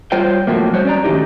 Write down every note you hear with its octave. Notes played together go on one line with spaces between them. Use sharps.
G3 F4 C5 C#5 G5
A2 F3 F#3 A3 A#3
G3 F#4 C5 C#5
C#4 D5 A#5
D#3 F#3 G#3 A3 D#4 G4